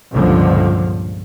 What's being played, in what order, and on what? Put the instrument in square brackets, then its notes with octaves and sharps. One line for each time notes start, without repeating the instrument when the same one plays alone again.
[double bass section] C#2 G2 A#2 D3 F3